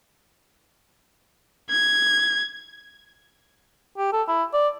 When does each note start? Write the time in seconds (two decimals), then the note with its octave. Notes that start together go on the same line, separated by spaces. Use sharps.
1.70 G#6
3.98 G4
4.13 A4
4.28 E4
4.53 D5